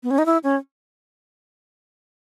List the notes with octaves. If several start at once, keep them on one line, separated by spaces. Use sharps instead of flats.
B3
C#4
D#4
E4
C#4